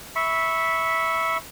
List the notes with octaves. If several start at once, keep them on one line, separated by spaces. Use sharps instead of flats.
E5 B5 C#6